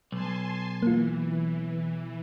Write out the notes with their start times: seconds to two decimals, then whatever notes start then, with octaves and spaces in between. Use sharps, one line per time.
0.12 B1 G#5 A5 C6
0.83 E3 A#3 F4